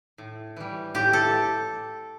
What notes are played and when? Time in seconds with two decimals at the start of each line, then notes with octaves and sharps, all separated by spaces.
0.18 A2
0.56 E3 G3
0.95 A2 G4
1.13 A4